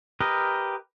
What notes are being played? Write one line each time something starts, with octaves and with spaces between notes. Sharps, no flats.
G4 A#4 B4 D#5